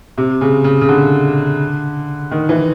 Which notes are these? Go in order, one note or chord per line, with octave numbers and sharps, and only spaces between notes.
C3
C#3
C#3
C#3
D3
D#3
E3